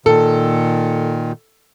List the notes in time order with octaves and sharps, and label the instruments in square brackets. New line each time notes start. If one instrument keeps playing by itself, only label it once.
[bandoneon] A#2 D#3 [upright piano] A4